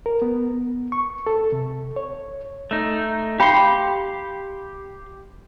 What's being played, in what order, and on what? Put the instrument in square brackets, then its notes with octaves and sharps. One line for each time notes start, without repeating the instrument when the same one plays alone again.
[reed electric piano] A#4
B3
C#6
A4
C3
C#5
[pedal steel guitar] A3 D#4
[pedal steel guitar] G4 C6 [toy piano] F5 G5 B5